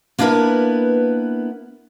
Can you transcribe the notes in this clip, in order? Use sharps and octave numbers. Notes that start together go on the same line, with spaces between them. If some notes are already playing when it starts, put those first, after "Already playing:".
A#3 B3 D4 E4 A#4 B4